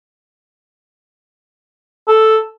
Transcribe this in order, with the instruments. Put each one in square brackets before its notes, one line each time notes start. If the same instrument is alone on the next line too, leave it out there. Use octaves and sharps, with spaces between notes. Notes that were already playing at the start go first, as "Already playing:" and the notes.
[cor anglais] A4